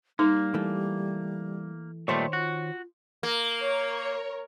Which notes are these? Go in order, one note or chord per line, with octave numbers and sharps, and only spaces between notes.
G3 A#3 D#4
E3 A3
A#2 D#3 G3 A3 C5 C#5
F4 F#4
A#3
A#4 C#5